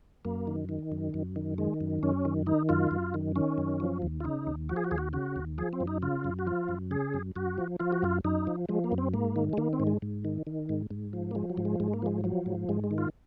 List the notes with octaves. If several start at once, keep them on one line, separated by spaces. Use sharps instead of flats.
F#2 A#3
D#3
D#3
F#2
F#2
D#3
D#3 G#3
F#2
F#2 C#4
D#3
D#3 D#4
F#2 F4
F#2
D#3
D#3 C#4
F#2
F3
D#2
F4
C#3 D#4
D#2
F3 F#4
G#4
F#4
D#2 G#4
F#4
C#3 F#4
D#2
F3 G#4
C4
F#2
D#4
C#3 F4
F#2
F#4
F3 F4
F#2
C#3 G#4
F#2
F#2 F#4
F3
F3 F4
F#4
F#2 F4
F#2 D#4
F3
F3 G#3
A#3
F#2
C4
G#2 A#3
D#3
G#3
D#3 A#3
C4
G#2
G#3
G#2
D#3
D#3
G#2
G#2
F3
A#3
F3 G#3
F#3
G#2
G#3
G#2 G#3
A#3
F3 G#3
F3 F#3
G#2
G#2 G#3
G#3
D#3
F4